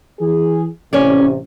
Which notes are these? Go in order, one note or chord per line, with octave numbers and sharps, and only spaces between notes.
E3 G#4
A1 C3 C#4 C#5 D5